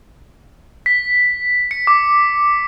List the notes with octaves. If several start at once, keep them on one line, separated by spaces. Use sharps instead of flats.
B6
C#7
D6